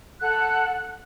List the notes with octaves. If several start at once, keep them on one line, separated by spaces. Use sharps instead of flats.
A4 F#5 F#6